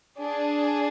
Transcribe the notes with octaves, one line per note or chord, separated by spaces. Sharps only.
D4 G#4